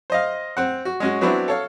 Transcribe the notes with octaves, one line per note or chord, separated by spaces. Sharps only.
C5 D#5 F5
C4 F#5
F#4
G#3 C#4 F#4
F#3 B3 C4 D4 E4 F#4
A4 C#5 F5